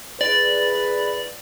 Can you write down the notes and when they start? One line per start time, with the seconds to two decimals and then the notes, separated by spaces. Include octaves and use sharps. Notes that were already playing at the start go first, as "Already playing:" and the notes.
0.21 E4 G#4 B4 D5